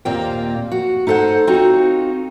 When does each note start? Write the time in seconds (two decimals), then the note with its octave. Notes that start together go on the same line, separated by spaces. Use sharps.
0.05 D#2 A#2 A#3 C4 F4 G5
0.71 F#4
1.07 D#4 E4 A4 C5 F#5
1.47 C4 D#4 F4 F#4